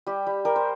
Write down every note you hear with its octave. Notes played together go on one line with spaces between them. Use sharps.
G3 G4
G3
G3 A#4
C5